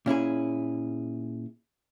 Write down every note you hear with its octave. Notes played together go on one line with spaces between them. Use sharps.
A#2 C#4 E4 G#4